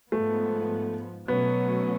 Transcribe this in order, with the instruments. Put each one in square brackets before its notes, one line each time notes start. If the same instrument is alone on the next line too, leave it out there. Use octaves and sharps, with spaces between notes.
[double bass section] G#2 F3 B3 [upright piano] A3
[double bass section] B2 F#3 A3 C#4 [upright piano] B3